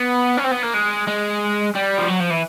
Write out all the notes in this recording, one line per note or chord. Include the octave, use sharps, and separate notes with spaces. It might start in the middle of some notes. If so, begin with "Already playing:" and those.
Already playing: B3
C#4
C4
B3
A#3
G#3
G#3
G3
F3
F#3
F3
E3